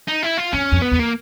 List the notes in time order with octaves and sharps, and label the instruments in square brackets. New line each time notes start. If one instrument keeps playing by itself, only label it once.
[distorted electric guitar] D#4
E4
F4
[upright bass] F2 [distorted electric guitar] C#4
[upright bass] F2
[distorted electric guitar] B3
[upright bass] E2
[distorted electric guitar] A#3